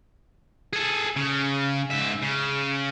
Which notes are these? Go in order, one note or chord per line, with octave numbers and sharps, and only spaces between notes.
G#4 A4
C#3
G#2 E5
C#3